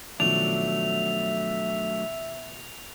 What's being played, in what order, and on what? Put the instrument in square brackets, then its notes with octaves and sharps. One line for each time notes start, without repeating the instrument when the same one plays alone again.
[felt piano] B2 D#3 F3 [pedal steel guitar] F#3 A3 D4 [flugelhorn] E5 [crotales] F7